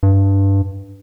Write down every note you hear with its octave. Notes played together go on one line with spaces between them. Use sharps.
G2